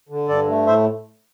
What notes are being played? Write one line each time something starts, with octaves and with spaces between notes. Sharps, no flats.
D3
G2 A4 D5
A3
A2 C5 E5